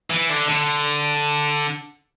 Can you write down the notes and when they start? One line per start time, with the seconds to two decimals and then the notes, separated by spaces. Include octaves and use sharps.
0.10 E3
0.29 D3
0.49 D3